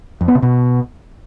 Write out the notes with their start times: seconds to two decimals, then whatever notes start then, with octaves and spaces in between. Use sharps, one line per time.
0.21 F2
0.28 B3
0.35 C3
0.42 B2